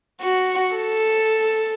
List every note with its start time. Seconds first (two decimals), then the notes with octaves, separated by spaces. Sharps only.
0.21 F#4
0.76 A4